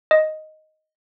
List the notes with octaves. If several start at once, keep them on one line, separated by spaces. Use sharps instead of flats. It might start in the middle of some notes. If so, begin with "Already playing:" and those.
D#5